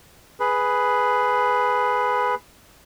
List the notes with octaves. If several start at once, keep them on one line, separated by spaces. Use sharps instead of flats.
G#4 B4